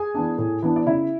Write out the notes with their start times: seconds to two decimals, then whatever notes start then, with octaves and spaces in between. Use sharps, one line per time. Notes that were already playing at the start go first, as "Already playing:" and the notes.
Already playing: G#4 G#5
0.15 E3 B3 D4
0.38 A2
0.62 E3 B3 D4
0.76 D5
0.86 C#3 E4 E5